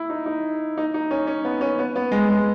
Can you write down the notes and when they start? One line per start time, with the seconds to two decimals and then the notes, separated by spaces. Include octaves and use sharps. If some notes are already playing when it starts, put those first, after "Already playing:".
Already playing: E4
0.10 D#4
0.26 D#4
0.77 D#4
0.94 D#4
1.11 C#4
1.27 C#4
1.45 B3
1.61 C#4
1.79 B3
1.96 B3
2.12 G#3
2.30 G#3